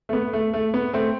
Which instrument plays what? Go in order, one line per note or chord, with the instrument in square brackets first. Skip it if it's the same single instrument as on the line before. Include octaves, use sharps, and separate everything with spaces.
[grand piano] A3
B3
A3
A3
B3
A3 C4